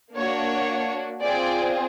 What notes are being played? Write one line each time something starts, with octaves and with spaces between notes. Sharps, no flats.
A#3 D4 F#4 C#5
C4 F4 G#4 D5